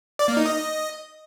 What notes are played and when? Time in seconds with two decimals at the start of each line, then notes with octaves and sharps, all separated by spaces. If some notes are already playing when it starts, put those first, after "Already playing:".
0.19 D5
0.28 A#3
0.37 D#4
0.46 D#5